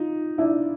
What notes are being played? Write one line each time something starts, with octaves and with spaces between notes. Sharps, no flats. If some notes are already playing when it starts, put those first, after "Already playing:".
Already playing: D#4 F4
D4 E4